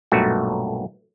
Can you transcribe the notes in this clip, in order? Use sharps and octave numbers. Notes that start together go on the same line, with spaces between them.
B1 G2 A#2 A3 F#4